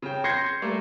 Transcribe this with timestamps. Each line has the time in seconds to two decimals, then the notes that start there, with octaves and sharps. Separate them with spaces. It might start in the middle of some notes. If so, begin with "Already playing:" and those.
0.02 C#3 G5
0.24 C6 G6 G#6 A#6 C7 C#7
0.62 G3 A3 A#3